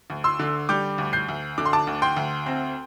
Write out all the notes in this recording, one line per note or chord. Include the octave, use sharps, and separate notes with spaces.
D2
C6 E6
D3
G3 D6 G6
D2
G6 C7
D2
D3 D6
C6
A5 D6
D2
G5 C6
D2
C4